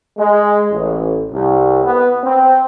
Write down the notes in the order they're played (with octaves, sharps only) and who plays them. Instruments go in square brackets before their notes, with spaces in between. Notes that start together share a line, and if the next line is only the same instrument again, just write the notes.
[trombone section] G#3
A1
C2
B3
C4